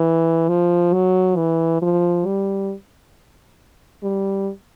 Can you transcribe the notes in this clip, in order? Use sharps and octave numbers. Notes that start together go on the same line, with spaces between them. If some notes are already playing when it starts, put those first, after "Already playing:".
Already playing: E3
F3
F#3
E3
F3
G3
G3